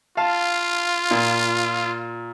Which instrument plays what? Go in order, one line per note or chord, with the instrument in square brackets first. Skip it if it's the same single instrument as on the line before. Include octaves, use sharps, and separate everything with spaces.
[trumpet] F4 [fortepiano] F5 A5
[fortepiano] A#2